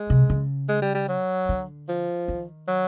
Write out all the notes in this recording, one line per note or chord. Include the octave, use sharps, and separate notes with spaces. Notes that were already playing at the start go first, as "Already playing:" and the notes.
Already playing: G#3
C3
C#3
G#3
G3
G3
F#3
D3
F3
D#3
F#3